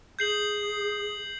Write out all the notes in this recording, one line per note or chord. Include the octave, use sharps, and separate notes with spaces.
G#4 G6 C7 F#7